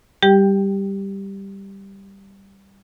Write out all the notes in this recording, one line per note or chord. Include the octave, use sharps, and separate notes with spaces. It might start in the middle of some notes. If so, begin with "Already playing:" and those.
G3 G4 G5